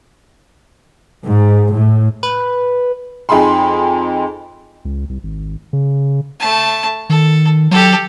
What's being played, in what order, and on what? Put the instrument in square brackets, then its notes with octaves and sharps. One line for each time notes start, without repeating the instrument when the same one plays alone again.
[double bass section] G#2
A2
[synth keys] B4
[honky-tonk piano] F2 D#4 G#4 B5 C6
[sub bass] C#2
C2
G#1
C#3
[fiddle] A3 A5
[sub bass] D#3 [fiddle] A4
[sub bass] F#3 [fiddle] G4 A4